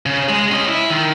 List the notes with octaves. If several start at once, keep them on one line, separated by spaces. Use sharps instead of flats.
C#3
G#3
C#4 D#5
E4
D#3